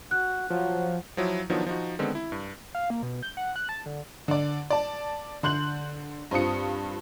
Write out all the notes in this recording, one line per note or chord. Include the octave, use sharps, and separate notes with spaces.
F#4 F#6
F3 F#3
F3 F#3 E4
D#3 F3 F#3 B3 D4 D#4
F3 D#4 F#4
D3 D#3 G#3 B3 C4
E4
G2
F5
A#3
B2
G6
F#5
F#6
A5
D3
D3 D5
D5 A5
D3 C6 F#6 G6 F#7
G2 C4 F4 D#6 C#7